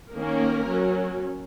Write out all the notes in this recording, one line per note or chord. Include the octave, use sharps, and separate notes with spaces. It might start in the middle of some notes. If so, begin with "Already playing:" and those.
D#3 A#3 C#4 A#4
F#3 C#4